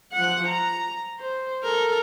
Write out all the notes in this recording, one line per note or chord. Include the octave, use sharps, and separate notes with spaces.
F3 F#5
A#5
C5
A4 A#4